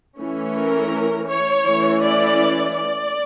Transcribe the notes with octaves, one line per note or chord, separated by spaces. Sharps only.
E3 A3 C#4
A#4
C#5
E3 A3 C#4
D5
D5